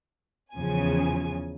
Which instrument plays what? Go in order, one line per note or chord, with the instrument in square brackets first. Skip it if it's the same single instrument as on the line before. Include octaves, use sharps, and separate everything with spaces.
[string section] E2 C#3 F3 G#5